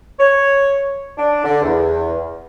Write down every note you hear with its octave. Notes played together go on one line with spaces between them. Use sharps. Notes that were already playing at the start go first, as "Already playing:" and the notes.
C#5
D4
D3
E2